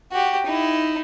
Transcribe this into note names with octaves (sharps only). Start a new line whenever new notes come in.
F#4 G4
D#4 E4